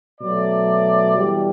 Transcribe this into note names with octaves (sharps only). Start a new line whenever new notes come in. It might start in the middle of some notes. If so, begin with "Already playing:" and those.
B2 F#3 A3 D5
E2 B2 G3